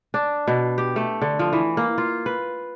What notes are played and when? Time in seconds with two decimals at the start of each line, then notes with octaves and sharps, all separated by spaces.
0.14 D4
0.48 B2
0.78 G4
0.96 A3
1.22 D3
1.39 F3
1.53 E3
1.77 A#3
1.98 F4
2.26 B4